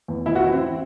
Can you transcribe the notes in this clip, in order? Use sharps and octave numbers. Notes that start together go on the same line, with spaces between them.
E2
E3 E4
F#4
E3 E4
C4